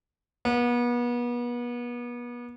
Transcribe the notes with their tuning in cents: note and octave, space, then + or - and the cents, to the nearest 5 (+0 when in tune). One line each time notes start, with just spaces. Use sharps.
B3 -35